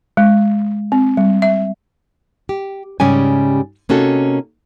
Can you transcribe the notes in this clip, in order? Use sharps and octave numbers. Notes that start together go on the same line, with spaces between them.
G#3
C4
G3
E5
G4
G#2 C#3 G3 C#4 G4 G#5
C3 A#3 C#4 D#4 F#4 A4